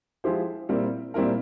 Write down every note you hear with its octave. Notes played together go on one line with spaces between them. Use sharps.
F3 G#3 E4 G4 C5
A#2 G3 C4 E4 A#4
A#2 G3 C4 E4 A#4